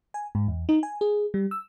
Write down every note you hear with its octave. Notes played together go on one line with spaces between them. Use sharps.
G#5
G#2
E2
D#4
G#5
G#4
G3
E6